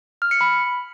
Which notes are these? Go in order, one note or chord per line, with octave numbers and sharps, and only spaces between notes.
F6
C#7
B5